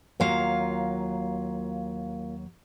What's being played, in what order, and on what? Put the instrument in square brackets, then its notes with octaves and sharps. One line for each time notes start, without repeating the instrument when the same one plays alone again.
[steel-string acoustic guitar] D#2 F#3 F5 [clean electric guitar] A#3 F4